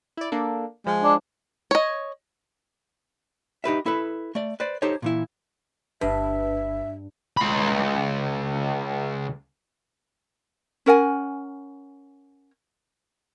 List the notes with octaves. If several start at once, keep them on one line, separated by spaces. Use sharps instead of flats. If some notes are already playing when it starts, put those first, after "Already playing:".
E4 D5
A#3 D4 A4
F3 G#3
D4
C#5 D#5
D#4 G4 B4 E5
E4 A4 B4
A3 D5
B4 C5 D5
D#4 G4 A4 C5 C#5
A#2 E3 E4
G1 G2 B4 E5
C#2 B5
C#4 A#4 F#5 G#5